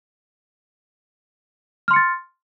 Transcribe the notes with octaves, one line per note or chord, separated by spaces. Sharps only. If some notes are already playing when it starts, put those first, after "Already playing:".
C6 F6 A6 C#7